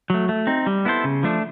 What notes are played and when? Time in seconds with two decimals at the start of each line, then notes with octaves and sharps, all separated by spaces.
0.10 F#3 A3
0.29 A3
0.47 C4 D#4
0.67 G3
0.85 B3 E4 A4 C5
1.04 C#3
1.23 F3 A3 D4